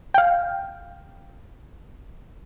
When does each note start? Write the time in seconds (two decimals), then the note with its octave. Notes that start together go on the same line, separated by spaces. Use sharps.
0.14 F5 G5